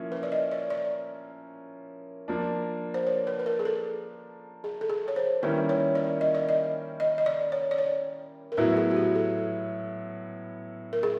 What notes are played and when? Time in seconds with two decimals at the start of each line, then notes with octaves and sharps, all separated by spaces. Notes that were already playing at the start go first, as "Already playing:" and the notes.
Already playing: F3 A#3 C#4 E4
0.12 B4
0.23 D5
0.32 D#5
0.51 D5
0.70 D5
2.28 F3 A#3 D4
2.94 C5
3.07 C#5
3.27 B4
3.39 B4
3.46 A#4
3.59 G#4
3.65 A4
4.64 G#4
4.81 A4
4.90 G#4
5.08 C#5
5.16 C5
5.42 D#3 G3 A#3 C#4 E4 B4
5.69 C#5
5.95 D5
6.21 D#5
6.35 D5
6.49 D#5
7.00 D#5
7.18 D#5
7.26 D5
7.52 C#5
7.71 D5
7.78 C#5
8.52 A#4
8.57 A2 F#3 B3 E4 B4
8.77 G#4
8.91 F#4
8.97 G4
9.15 A4
10.93 A#4
11.03 G#4